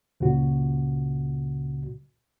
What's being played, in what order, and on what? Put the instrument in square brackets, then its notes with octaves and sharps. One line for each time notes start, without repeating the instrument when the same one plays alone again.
[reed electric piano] C#2 A#2 C#3 F#4